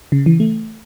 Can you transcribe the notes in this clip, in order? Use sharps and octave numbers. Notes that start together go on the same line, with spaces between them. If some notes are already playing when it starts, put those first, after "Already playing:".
C#3
E3
A3